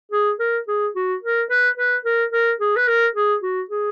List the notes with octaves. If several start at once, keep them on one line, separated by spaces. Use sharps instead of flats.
G#4
A#4
G#4
F#4
A#4
B4
B4
A#4
A#4
G#4
B4
A#4
G#4
F#4
G#4